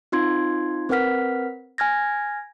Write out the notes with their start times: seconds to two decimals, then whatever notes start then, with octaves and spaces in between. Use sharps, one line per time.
0.12 C4 D#4 F4 C6 G#6
0.89 C4 A#4 B4 F#5 F6 B6
1.78 G#5 F6 G#6 A#6